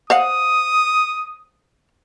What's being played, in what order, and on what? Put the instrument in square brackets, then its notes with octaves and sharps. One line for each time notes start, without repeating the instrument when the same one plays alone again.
[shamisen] C5 F5 F#5 [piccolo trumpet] D#6